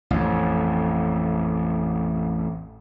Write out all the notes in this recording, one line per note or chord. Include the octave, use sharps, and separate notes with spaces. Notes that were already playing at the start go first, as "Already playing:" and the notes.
A1 F2